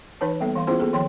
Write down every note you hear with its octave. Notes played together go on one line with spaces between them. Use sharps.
E3 D#4 B4 C#5 A5
G3 A#3 B3 A4 E5
E3 F5 C6
B3 C#4 E4 F4 G#4 C5
A#3 B3 G#4 A4
D#3 F3 C#5 G5 C6